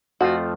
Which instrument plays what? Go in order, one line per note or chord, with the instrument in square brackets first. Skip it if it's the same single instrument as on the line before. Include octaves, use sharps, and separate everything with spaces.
[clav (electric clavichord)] F2 F3 A3 F4 [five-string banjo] F#4